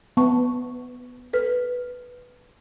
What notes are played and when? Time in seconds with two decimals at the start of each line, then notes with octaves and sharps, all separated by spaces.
0.17 B3 A5 C#6
1.33 A4 B4 F6